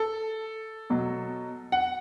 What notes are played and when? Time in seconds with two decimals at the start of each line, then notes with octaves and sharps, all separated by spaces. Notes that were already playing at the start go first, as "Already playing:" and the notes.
Already playing: A4
0.90 B2 F#3
1.72 F#5